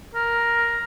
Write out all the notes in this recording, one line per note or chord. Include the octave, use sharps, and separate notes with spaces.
A#4